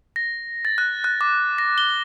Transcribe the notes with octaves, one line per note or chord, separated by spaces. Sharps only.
A#6
A6
F#6
F#6
D6
A#6
G7